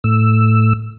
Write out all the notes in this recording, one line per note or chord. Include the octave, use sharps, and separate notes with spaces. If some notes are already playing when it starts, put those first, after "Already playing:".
A2 E6